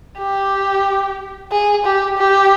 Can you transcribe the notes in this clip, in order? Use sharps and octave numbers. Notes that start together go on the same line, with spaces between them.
G4
G#4
G4
G4